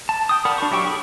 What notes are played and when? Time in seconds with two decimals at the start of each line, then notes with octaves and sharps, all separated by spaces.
0.09 A5
0.29 G5 D#6
0.45 A#4 D5 F#5 A5 B5
0.58 D4 F#4 C#6
0.71 F#3 E4 G4 G5 C#6
0.87 G#4 A4 B5